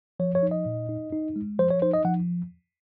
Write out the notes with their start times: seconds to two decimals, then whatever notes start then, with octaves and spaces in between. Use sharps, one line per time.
0.20 F3 C#5
0.35 C#5
0.43 D#4
0.51 D#5
0.66 A#2
0.89 D#4
1.12 D#4
1.36 G#3
1.59 F3 C5
1.70 C#5
1.82 D#4 C5
1.93 D#5
2.05 F3 F#5